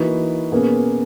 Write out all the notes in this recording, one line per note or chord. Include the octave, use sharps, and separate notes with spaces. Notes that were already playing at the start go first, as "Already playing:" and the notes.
Already playing: E3 A#3 D#4 F#4 B4
B2 A#3 C#4 G#4 B4